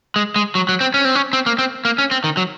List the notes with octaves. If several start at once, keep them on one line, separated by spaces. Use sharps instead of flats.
G#3
G#3
F#3
F#3
C4
C#4
C4
C#4
C4
A#3
C4
A#3
C#4
C4
D#3
F#3